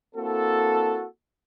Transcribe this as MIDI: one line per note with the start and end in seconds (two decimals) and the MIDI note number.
0.16 1.06 58
0.16 1.06 60
0.16 1.06 64
0.16 1.06 66
0.16 1.06 69